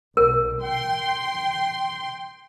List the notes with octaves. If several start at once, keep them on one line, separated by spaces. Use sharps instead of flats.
B1 A#4
G5 C6